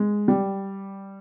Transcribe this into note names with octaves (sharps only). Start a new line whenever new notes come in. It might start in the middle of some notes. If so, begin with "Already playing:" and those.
Already playing: G#3
G3